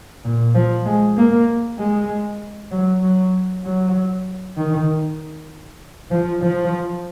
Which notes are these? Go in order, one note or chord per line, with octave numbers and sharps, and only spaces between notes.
A#2
F3
G#3
A#3
G#3
F#3
F#3
F#3
D#3
F3
F3